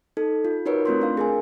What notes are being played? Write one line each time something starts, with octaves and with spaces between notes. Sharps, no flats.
D#4 A4
F4
D#4 F#4 A#4 B4 C#5
A3 C4 F4 C6
D4 F5
G#4 A#4 G#5